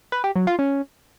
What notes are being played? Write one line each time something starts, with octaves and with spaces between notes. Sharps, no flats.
B4
G4
F#3
F4
C#4